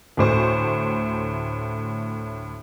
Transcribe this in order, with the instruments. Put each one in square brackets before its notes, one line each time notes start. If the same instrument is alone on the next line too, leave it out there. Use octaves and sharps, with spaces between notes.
[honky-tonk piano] D2 A2 C5 C#6